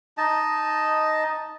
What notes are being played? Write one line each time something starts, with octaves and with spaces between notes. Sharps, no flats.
D#4 D#5 A5